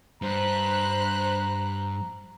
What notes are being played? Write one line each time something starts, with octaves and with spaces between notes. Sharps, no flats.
G2 C5 A#5 B5 F#6